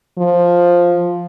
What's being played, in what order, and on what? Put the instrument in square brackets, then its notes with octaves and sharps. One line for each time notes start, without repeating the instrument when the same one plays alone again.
[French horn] F3